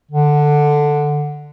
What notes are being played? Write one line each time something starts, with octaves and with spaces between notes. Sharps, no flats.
D3